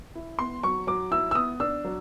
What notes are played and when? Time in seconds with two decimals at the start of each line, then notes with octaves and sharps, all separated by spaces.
0.15 E4
0.39 B3 C6
0.63 F#3 C#6
0.87 F#3 D6
1.11 E4 E6
1.31 E6
1.35 B3 D#6
1.60 D4 E6
1.84 F#3